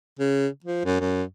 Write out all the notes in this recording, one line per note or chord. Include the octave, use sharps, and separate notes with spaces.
C#3
F3
F#2
F#2